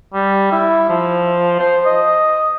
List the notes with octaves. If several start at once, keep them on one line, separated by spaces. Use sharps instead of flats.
G3
E4
F3
C5
D#5